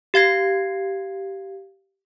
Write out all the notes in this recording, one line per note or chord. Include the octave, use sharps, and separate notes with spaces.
G4 F5 G#6 C7